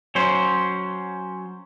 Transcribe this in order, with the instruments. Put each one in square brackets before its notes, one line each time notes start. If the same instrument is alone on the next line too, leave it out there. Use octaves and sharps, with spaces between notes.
[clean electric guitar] F#3 C#4 C5